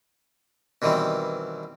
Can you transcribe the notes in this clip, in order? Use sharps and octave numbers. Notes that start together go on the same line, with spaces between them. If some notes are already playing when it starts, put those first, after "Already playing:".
B2 D#3 E3 G3 C4